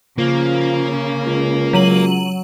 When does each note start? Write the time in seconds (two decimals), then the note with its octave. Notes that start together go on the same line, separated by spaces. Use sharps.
0.18 C#3 F3 A#3
1.26 C#2
1.73 F#3 D#7 F#7